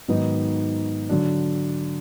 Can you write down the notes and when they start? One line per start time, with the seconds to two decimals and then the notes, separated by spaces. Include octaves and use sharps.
0.08 G#2 D#3 F#3 B3 D#4
1.09 D3 F#3 D4